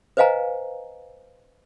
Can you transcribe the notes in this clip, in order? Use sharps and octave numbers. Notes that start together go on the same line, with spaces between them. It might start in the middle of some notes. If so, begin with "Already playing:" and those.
B4 C5 D#5 F5 G#5 A#5